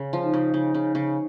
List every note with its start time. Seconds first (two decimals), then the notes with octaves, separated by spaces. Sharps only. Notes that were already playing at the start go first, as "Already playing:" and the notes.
Already playing: C#3
0.13 F3
0.23 D#4
0.34 C#3
0.54 C#3
0.74 C#3
0.95 C#3